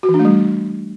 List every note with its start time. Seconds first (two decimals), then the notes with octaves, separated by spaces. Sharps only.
0.03 F#4
0.09 E3
0.14 D4
0.19 A3
0.25 G3